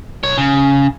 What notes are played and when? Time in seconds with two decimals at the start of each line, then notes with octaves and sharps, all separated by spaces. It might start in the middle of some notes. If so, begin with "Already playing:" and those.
0.23 B1 C#5
0.37 C#3